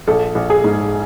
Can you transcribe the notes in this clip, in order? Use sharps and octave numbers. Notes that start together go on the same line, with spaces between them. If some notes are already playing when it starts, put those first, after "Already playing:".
A#1 A4
A#1
G#4
G#2